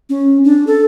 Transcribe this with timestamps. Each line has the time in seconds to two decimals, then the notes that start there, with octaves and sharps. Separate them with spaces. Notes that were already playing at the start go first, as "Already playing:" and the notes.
0.09 C#4
0.44 D4
0.67 A4